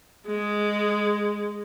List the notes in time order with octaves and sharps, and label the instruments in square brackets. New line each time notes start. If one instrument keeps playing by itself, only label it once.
[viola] G#3